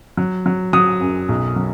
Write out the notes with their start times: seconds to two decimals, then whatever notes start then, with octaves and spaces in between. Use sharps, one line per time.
0.17 F#3
0.46 F#3
0.73 F#3 D#6
1.01 F#2
1.29 B1
1.56 F#3